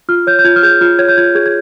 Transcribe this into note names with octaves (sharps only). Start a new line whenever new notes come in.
F4 F6
C#5 G6
G6
F4 G#6
F6
G#4 G6
F4 F6
C#5 G#6
G6
F4 G#6
G#4 G#6
G#6